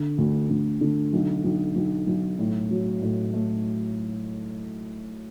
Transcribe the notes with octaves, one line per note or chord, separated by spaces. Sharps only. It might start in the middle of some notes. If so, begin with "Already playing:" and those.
Already playing: D3
D2
D2
D3
B1
B1
B1
B1
A2
F#3
A2
A3